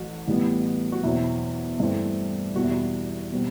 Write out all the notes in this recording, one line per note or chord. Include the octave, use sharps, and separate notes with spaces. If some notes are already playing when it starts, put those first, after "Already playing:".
Already playing: A1 F#3 F#4
A1 A2 G3 B3
F#4
E2 B2 F#3 C4 E4
G2 E3 A3 C4
E2 B2 G3 F#4
E4
F#4
B2 G3 C4